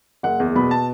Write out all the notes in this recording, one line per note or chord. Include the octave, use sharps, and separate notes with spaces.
F#1 F#5
E2
B2 B5
A5